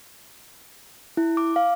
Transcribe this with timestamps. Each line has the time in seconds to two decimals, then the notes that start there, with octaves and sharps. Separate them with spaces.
1.17 E4
1.37 D6
1.56 F5